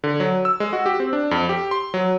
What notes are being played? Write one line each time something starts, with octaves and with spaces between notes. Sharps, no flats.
D3
F#3
E6
G#3
F#4
G4
C4
D4
F2
G4
C6
F#3